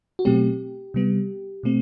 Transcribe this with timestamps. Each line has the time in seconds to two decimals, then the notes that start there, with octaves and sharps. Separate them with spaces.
0.19 F#4
0.25 B2 F#3 A3 C4 G4
0.94 C3 G3 B3
1.63 B2 A3 C4